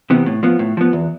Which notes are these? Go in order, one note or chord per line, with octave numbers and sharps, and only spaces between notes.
C3 E3 B3
A2
F3 B3
A2
F3 B3
E2